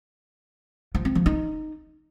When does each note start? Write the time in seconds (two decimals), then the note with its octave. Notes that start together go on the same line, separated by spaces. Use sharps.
0.95 F3
1.05 C4
1.15 F3
1.26 D#4